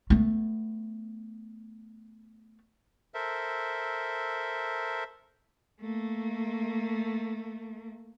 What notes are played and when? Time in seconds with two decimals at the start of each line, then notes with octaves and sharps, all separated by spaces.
0.10 A3 B3
3.14 A4 A#4 C5 E5
5.81 A3 A#3